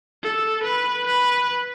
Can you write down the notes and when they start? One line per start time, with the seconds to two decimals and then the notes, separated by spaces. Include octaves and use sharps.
0.23 A4
0.64 B4
1.06 B4